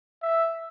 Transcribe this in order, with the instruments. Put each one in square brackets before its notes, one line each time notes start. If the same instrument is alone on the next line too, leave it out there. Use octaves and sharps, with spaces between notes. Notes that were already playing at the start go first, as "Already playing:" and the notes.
[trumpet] E5